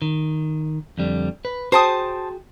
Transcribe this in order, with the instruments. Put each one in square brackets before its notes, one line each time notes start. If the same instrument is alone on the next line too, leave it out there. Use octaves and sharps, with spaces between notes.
[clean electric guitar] D#3
F2 D3 G3
B4
[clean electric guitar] F#4 G#4 G5 [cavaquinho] C5 A5 D#6